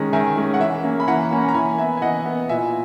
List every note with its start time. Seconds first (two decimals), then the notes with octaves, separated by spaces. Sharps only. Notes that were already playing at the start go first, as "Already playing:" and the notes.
Already playing: D#3 G#3 C#4 A#5
0.13 D#3 E5 G#5
0.37 G#3 C#4
0.54 F#5
0.60 E3 E5
0.84 A#3 C#4
1.00 B5
1.08 E3 F#5 A#5
1.31 A#3 C#4
1.48 A#5
1.54 E3 G#5 B5
1.78 B3 E5 G#5
1.97 G#5
2.02 E3 D#5 F#5
2.26 B3
2.49 A#2 E5 G#5